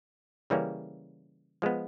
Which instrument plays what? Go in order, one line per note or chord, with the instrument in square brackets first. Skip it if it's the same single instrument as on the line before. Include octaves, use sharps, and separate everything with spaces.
[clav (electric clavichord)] C#3 E3 G3 A#3 C#4
F3 G#3 B3